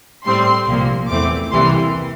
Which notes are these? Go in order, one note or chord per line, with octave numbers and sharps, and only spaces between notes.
A2 G3 C4 C6
C2 A#2 F3 A#3
E2 E3 A3 C4 D6
C2 C3 E3 G3 A#3 C6